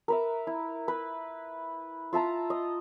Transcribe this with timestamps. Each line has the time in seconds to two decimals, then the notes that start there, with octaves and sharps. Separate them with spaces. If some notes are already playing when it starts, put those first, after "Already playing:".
0.08 A#4 B4 E5
0.47 E4
0.88 B4
2.13 F4 E5 A5 A#5
2.50 D#5